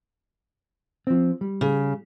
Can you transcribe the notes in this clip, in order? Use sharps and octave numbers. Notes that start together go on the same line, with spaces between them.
F3 C4
G3
C#3